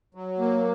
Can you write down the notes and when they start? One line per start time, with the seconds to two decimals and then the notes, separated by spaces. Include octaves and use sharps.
0.15 F#3
0.38 A#3